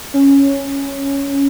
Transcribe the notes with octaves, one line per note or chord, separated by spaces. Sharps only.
C#4